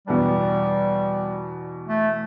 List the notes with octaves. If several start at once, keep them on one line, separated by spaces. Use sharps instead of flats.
E2 B2 G3 B3 D4
A3